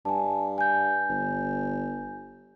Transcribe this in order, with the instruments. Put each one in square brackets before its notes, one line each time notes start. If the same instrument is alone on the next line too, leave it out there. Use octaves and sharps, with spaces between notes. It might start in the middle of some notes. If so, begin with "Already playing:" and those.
[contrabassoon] G2 [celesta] G#5 A5
[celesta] G#5 G6
[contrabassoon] G1